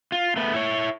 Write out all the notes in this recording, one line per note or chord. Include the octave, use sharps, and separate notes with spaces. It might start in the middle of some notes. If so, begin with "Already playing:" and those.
F4
A3 B3
E4 C#5